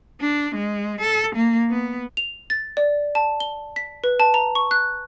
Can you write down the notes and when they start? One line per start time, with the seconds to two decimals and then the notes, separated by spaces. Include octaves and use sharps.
0.21 D4
0.55 G#3
1.00 A4
1.35 A#3
1.70 B3
2.17 F7
2.50 A6
2.77 D5
3.15 A5
3.40 G7
3.76 B6
4.04 B4
4.20 A5
4.34 A#5
4.55 C#6
4.71 F#6